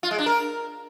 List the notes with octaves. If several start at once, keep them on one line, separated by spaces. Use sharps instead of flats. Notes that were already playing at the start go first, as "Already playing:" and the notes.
F4
G#3
D4
A#4